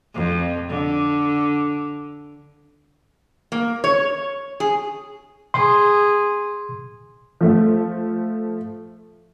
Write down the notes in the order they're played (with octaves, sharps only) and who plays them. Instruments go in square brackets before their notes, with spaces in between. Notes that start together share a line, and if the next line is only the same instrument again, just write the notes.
[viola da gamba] F2
D3
[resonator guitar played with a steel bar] A#3
C#5
G#4
[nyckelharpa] G#4 [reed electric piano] C6
[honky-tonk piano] F3 A3